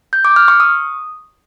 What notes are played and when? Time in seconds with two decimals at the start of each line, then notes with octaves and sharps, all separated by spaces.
0.13 G6
0.25 D6
0.36 F6
0.48 C#6
0.60 D#6